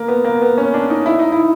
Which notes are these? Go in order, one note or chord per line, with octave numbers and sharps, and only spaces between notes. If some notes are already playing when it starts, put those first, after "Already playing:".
Already playing: A#3
B3
A#3
B3
C#4
D4
D#4
E4
D#4
E4